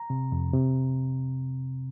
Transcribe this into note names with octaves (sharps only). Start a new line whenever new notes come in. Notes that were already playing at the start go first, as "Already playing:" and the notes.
Already playing: A#5
C3
F2
C3